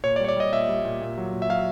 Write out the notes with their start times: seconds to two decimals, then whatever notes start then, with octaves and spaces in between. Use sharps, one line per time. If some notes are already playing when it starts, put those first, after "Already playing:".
0.04 A#2 C#5
0.16 D5
0.20 G3 C#5
0.28 D5
0.36 G3 D#5
0.53 A#2 E5
0.69 G3
0.85 A#2
1.01 A#2
1.18 F#3
1.33 A#2
1.42 E5
1.49 F#3 F5